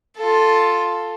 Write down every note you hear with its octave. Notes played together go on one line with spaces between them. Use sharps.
F4 A4